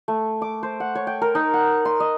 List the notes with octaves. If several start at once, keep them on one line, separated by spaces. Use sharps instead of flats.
A3
D6
C5
F#5
C#5
G5
A#4
D#4
F#5
C6
D#5